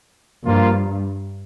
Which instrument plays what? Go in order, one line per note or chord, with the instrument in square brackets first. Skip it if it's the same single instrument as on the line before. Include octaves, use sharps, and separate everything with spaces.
[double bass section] G2 [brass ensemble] F3 A#3 F4